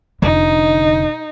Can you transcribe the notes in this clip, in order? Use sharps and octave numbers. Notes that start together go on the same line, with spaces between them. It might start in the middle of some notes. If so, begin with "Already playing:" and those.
F1 D3 D#4